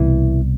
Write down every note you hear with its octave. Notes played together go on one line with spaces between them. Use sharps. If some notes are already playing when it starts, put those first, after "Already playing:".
Already playing: C2 B2 E3